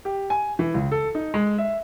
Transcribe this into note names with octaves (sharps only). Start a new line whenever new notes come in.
G4
G#5
E3
C#2
A4
D#4
G#3
E5